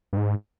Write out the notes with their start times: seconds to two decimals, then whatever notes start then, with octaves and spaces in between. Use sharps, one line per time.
0.13 G2
0.17 G#2